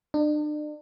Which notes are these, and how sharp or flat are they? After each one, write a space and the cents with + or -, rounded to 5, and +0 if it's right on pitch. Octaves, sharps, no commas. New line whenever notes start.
D4 +40